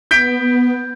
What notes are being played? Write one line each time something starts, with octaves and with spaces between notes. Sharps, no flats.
B3 G6 B6 D7